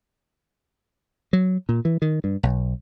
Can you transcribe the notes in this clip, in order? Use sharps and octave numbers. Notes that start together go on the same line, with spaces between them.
F#3
A#2
E3
D#3
G2
B1